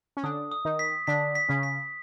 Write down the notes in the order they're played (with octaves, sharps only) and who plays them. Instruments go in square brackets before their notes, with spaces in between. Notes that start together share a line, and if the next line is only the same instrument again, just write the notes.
[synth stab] C#4
[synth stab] D3 D4 [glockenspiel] D#6
[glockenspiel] D#6
[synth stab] D#3 D#4
[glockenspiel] B6
[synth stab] D3 D4 [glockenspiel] B6
[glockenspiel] B6
[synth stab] C#3 C#4
[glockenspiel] B6